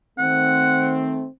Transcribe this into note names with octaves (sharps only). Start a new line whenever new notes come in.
D#3 A3 C4 F#5